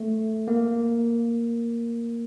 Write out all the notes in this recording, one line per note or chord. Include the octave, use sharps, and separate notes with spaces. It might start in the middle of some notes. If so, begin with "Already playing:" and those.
Already playing: A3
A#3